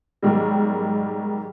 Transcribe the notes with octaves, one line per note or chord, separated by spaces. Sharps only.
B1 G#2 D#3 G3